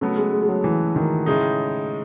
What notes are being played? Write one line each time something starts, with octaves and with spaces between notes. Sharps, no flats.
C#3 F#3 A3 B3
G#3
G#3
G#3
F#3
E3
D#3
A2 C#3 G#3 D#4